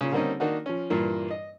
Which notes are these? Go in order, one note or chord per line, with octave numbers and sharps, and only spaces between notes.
A#2 C#3
D3 G3 A#3 C4 C#4 D#4
D#3 A#3 D4 D#4 F#4
F3 C#4
G2 A#2 E3 A#3
D#5